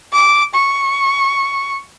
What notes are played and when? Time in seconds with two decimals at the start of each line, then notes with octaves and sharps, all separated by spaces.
0.13 D6
0.54 C#6